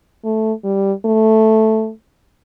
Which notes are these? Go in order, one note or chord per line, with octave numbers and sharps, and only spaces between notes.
A3
G3
A3